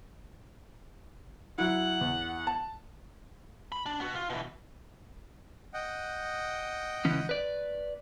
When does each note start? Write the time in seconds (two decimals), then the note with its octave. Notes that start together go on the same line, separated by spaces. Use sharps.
1.58 F#3 E4 F#5
2.01 E2
2.47 A5
3.72 B5
3.86 D4
4.00 B3 F#4
4.15 F4
4.30 B2 E3
5.74 D#5 F#5 G5
7.05 C#2 E3 C#4
7.29 B4 D5